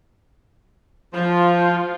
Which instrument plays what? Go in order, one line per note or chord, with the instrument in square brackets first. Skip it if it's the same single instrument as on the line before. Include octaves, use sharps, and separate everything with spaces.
[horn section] F3 [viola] F4